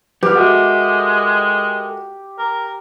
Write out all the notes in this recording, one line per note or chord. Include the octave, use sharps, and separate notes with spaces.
F3 G3 F#4 G4 B4 F6
G#3 F#4 A4 A#4 E5
A#4